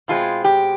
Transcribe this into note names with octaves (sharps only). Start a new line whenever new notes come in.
B2 G#3 C4 F4
G4